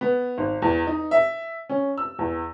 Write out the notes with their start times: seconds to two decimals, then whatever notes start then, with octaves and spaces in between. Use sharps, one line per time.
0.01 B3
0.38 G#1
0.62 E2
0.87 D#4
1.11 E5
1.69 C#4
1.98 E6
2.19 E2